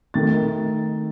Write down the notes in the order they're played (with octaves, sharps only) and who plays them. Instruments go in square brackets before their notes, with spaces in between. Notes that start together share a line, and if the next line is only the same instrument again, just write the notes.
[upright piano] D#3 A3 A6